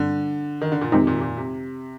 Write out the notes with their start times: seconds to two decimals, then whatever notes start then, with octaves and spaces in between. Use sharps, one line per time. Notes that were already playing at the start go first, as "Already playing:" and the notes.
Already playing: G2 D3 G3 C4
0.62 D#3
0.72 D3
0.81 A#2
0.92 F2 C3 D#3 G#3 C4 D#4
1.07 A#2
1.16 C3
1.21 A#2
1.37 C3